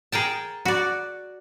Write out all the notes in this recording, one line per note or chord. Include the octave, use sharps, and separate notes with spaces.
G#4 A#4 G5 A5
F#4 D5